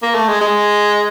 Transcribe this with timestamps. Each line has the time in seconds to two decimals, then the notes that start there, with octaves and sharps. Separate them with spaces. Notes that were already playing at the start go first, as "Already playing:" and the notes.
0.02 A#3
0.15 A3
0.28 G#3
0.41 G#3